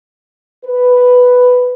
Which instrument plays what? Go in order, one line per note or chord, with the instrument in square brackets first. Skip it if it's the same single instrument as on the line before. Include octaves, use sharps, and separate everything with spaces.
[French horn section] B4